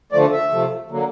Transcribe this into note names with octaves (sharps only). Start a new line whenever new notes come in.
D3 F3 A3 D5
E5
C3 F3 A3
D3 F#3 A#3